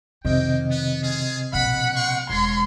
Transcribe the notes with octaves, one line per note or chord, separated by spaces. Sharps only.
F2 C3 D#3 A#3 C4 D#5 G5
B3
F4 G#4
A#1 B2 F#5 B5
G5 C6 C#6
E1 A#4 C#5 C6